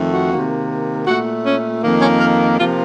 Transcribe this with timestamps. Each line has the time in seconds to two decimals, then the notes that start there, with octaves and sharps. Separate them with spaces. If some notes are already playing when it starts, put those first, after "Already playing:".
Already playing: F2 D#3 A3
0.12 F#4
0.31 C3 D#3 A#3
1.06 A#2 A3 F#4
1.45 C#4
1.83 F2 D#3 A#3
2.02 C#4
2.21 A#4
2.58 C3 F3 A#3 F4